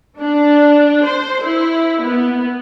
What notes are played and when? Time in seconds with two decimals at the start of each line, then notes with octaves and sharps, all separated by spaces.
0.20 D4
1.05 C5
1.46 E4
2.01 B3